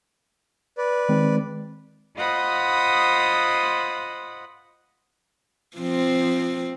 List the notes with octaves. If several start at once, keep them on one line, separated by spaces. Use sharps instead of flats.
B4 D5
D#3 G#3 C4
F4 C5 D#5 F#5 B5 D#6
F3 C4